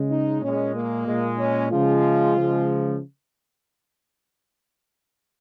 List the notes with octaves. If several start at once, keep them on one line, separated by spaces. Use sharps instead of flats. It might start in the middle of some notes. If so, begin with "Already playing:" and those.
Already playing: C#3 G#3
D#4
A#2 G#3 C#4
A#3
A#2 G#3
C#4
C#3 F3 G#3 F4
C#3 F3 G#3